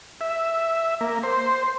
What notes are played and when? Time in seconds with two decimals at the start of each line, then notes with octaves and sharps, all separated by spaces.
0.21 E5
1.01 A#3
1.23 C5